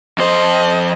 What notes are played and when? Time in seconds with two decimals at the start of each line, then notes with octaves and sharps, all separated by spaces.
0.18 F2 C5 D#5